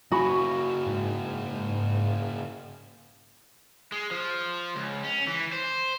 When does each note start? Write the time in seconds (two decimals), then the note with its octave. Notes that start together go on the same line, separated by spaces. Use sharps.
0.12 C#3 A#3 F#4 G#5 B5
0.86 G#2
3.92 G#3
4.11 F3
4.76 C#2
5.04 C#4
5.27 E3
5.53 C5